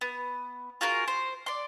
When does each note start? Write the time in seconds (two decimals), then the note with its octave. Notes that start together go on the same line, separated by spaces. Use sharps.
0.01 B3
0.81 F4 F#4 G#4 A#4
1.08 C5
1.46 D5 C6